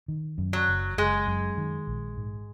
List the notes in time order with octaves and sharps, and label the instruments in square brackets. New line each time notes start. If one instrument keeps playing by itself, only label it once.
[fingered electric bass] D#3
F#2
[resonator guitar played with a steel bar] F#3
[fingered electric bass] F#1
[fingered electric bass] F#1 [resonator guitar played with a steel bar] G#3
[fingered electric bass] F#2
D#3
A#1
G#2